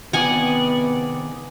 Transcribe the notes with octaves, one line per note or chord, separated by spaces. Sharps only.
C3 D#3 B3 G#4 D5 F#5 G#5